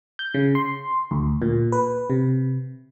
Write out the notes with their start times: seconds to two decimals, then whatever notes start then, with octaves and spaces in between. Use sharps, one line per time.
0.19 G6
0.34 C#3
0.55 C6
1.11 D2
1.42 A#2
1.72 B4
2.10 C3